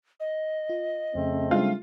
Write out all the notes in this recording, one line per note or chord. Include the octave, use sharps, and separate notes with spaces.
D#5
F4
F2 C#3 A3 C4
G3 G#3 D4 F4